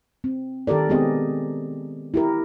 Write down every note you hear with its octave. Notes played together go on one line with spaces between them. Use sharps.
C4
D#3 G4 A4 A#4 D5
G#3 B3 C4 G4 G#4 D#5
E4 G4 A#4